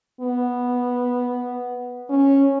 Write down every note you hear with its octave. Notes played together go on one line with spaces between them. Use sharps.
B3
C#4